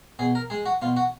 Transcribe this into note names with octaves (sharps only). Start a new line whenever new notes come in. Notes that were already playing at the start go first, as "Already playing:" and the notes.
B2 G#4
A#4
G#3 G#4
F#4
B2 F4
F#4